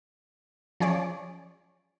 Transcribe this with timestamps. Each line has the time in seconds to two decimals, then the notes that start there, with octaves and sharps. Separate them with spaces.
0.80 F3 C#4 G#4 C#5 D5